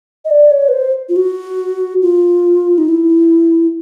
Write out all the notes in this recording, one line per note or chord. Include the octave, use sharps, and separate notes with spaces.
D#5
D5
C#5
B4
C5
F4
F#4
F4
D#4
E4